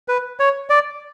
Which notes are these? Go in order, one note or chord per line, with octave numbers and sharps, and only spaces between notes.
B4
C#5
D5